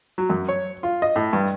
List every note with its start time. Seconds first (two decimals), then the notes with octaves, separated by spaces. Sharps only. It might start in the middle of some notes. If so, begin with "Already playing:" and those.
0.18 F#3
0.30 F#2
0.48 C#5
0.83 F4
1.02 D#5
1.16 A2
1.33 G2